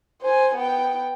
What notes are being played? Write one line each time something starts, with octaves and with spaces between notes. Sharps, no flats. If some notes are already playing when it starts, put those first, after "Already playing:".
C5 G#5
B3 G5